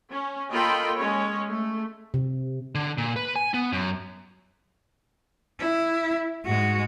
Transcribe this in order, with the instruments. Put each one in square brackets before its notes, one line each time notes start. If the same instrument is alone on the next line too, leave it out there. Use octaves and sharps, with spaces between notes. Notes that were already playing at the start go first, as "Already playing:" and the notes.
[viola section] C#4
A#3 F4 A4 D#5 G5 B5
G#3 C#4 C#5
A3
[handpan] C3
[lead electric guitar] D3
A#2
B4
G#5
B3
F#2
[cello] E4
[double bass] G#2 [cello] G#3 F#4